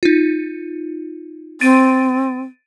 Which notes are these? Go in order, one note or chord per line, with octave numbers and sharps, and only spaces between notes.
D#4 F4
C4 A6 D7 D#7